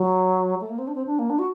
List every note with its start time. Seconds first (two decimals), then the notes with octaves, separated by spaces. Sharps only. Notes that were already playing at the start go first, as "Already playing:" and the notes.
Already playing: F#3
0.61 A3
0.69 A#3
0.78 C4
0.87 D4
0.95 C4
1.06 D4
1.19 A#3
1.30 D4
1.39 F#4